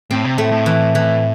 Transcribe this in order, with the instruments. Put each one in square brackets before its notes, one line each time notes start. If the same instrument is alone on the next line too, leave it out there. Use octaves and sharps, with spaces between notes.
[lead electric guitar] A2 [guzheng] C4
[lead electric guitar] C3
[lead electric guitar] A2 [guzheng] A3
[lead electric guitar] A2
[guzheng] E3
E3